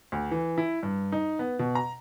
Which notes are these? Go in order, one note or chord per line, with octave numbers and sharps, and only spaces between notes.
D2
E3
E4
G2
D#4
B3
B2
A#5